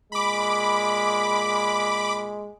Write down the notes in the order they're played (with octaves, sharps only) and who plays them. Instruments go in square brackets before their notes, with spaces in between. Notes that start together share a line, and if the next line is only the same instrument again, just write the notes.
[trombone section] A#2 G#3 [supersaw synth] B5 D6